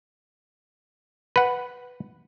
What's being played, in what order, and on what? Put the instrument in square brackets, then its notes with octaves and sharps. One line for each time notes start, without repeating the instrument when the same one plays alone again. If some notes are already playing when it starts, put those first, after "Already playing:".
[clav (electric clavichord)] B4 F#5